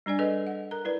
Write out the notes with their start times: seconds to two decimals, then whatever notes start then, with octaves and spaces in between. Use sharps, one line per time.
0.06 G3 D4 D5 G#5
0.19 G#4 A4 B4 D#5
0.47 F#5
0.71 A#4 A#5
0.85 E4 B4 D5